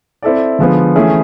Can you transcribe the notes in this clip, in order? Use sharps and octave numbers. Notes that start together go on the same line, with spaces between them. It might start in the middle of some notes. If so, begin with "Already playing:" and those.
C4 E4 A4 D5
D3 F3 G#3 B3
E3 A3 C#4 E4 G#4